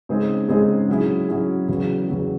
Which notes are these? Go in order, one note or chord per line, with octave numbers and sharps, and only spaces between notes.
C#3 G#3 C4 D#4 G#4
C#3 G#3 C4 D#4 G#4
F#3 C#4 E4 G#4
F#3 C#4 E4 G#4
E2 C#3 F#3
E2 C#3 F#3